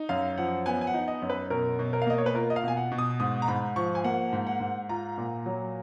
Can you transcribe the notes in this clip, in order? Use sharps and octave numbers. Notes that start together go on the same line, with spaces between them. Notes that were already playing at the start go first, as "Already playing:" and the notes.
Already playing: D#4
F#2 F5
F3 F#5
B3 G#5
G#5
F#5
D#4
D#5
F#2
B4
B2 A#4
B2
A#4
F5
A#3 D#5
C#5
B4
F4 A#4
D#5
F5
B2 G#5
F#5
B2
D#6
G#2 D#6
A#5
G#2 B5
F3 C#6
G#5
A#3 F#5
G#2
F#5
G#2
F4 A#5
A#2
F#3